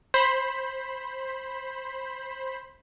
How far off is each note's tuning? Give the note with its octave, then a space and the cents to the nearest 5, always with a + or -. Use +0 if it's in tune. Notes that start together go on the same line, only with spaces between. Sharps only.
C5 +15 B5 +0